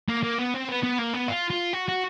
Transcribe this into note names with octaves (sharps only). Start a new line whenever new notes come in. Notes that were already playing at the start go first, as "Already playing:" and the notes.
A#3
A#3
B3
C4
B3
B3
A#3
B3
F4
F4
F#4
F#4